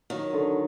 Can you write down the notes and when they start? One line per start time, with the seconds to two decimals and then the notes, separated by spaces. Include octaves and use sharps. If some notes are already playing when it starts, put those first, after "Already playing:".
0.10 D#3 F#3
0.33 D3